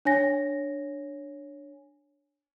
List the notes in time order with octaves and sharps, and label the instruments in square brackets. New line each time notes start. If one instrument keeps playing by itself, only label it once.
[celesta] D4 C#5 G#5 A#6